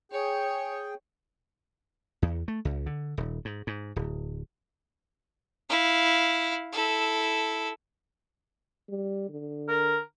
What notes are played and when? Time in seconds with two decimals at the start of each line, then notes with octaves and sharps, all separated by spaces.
0.12 G#4 C#5 G5
2.22 E2
2.48 A3
2.65 C#2
2.86 D3
3.17 D#1
3.45 G#2
3.67 G#2
3.96 D1
5.69 E4 F5
6.72 E4 A4
8.89 G3
9.29 D3
9.68 A#4